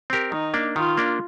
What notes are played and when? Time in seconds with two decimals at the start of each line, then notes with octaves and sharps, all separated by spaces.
0.10 C4 G4 A#4
0.32 D#3 D#4
0.54 A#3 D4
0.76 D#3 F4
0.97 A#3 D4